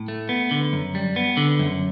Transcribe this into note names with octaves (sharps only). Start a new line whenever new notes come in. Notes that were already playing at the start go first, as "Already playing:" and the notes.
Already playing: A2
A3
B3
D3
F#2
G3
B3
D3
F#2